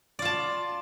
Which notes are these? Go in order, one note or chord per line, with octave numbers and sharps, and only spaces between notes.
F4 D5 A5